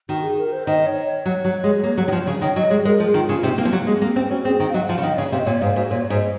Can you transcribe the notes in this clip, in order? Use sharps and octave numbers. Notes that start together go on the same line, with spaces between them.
D#3 F#4
G#4
A#4
C5
D#3 D#5
C#5
C#5
F#3
F#3
G#3
A#3
F#3
D#3
F3
C#3
D#3 C#5
F#3 D#5
G#3 C#5
G#3 A#4
F3 G#4
D#3 F4
C#3 F4
C3 D#4
A#3 C4
F3
F#3
A#3
G#3
A#3 C4
C4 C#4
C#4 F#4
C4 G#4
D#3
F5
F#3 D#5
F#5
F3 F5
C#3
D#3 D#5
C#3 C#5
C3 F5
D#5
A#2 C#5
G#2 F5
G#2 F#4
A#2 C#5
G#2 D#5